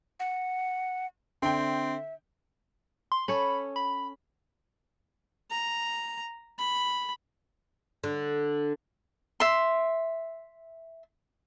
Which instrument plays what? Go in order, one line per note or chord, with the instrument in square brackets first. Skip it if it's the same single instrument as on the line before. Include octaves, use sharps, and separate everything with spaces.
[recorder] F#5
[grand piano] D3 G5 [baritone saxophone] C4 [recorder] E5
[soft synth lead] C6
[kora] C#4 A4 C#5 [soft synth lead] B5
[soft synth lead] B5
[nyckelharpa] A#5
B5
[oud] D3
[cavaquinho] E5 C6